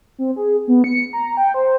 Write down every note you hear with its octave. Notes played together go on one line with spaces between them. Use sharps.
C4
G#4
B3
C#7
A#5
G5
C5